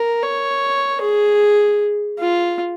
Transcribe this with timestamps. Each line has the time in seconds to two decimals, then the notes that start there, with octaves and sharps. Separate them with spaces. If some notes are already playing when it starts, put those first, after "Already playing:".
Already playing: A#4
0.23 C#5
1.01 G#4
2.19 F4